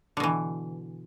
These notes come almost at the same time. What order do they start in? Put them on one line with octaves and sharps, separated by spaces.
D3 B2 E3